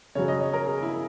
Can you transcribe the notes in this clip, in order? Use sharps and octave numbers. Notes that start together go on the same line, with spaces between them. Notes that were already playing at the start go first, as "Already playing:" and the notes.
C#3 F#3 C#5
D#5
C#5
A#4
G#4
E4